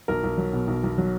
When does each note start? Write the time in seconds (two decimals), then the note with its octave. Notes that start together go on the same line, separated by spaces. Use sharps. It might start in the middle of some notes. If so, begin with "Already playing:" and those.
0.08 B1 A#4
0.24 B1
0.38 F#3
0.53 B2
0.67 B1
0.84 B1
0.98 F#3